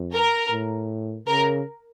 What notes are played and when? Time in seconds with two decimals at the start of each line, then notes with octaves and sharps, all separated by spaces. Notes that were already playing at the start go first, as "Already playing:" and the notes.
Already playing: F2
0.13 A#4
0.51 A2
1.27 C#3 A#4